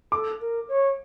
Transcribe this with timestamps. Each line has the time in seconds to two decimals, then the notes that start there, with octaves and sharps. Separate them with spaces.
0.12 A4 D6
0.40 A#4
0.69 C#5